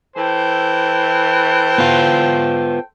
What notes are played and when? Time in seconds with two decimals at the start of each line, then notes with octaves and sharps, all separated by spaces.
0.17 E3 A4 C5 G5
1.78 B3 F4